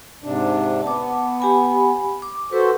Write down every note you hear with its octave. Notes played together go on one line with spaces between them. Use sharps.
G#2 C3 D4
B3 A5 D6
G4 G#5 B5
D6
F#4 A4 B4 C5